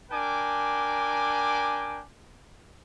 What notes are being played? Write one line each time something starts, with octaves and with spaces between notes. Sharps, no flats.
D4 A#4 G5 G#5 D6